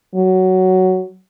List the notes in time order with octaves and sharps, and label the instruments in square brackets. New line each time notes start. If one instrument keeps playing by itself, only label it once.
[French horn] F#3